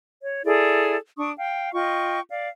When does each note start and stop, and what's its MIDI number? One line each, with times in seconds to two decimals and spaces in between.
0.21 0.42 73
0.45 0.96 64
0.45 0.96 68
0.45 0.96 69
0.45 0.96 74
1.17 1.31 62
1.17 1.31 85
1.17 1.31 87
1.37 1.71 77
1.37 1.71 79
1.73 2.21 65
1.73 2.21 75
1.73 2.21 79
1.73 2.21 85
2.29 2.48 74
2.29 2.48 77